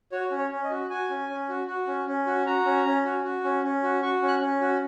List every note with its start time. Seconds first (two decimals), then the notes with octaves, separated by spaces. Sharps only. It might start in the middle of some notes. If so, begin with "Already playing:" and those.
0.12 F#4 C#5
0.31 C#4
0.38 C#5
0.50 C#4
0.64 D#5
0.71 F#4
0.90 F#4 G#5
1.10 C#4
1.29 C#4
1.49 F#4
1.67 F#4
1.87 C#4
2.07 C#4
2.27 F#4
2.46 F#4 A#5
2.65 C#4
2.85 C#4
3.05 F#4
3.24 F#4
3.44 C#4
3.64 C#4
3.83 F#4
4.02 F#4 C#6
4.22 C#4
4.28 F#6
4.41 C#4
4.61 F#4